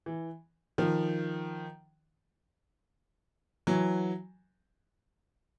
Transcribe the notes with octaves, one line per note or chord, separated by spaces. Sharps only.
E3
D#3 F3
E3 F#3